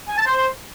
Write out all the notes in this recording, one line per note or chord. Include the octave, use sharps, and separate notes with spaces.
G#5
A5
C5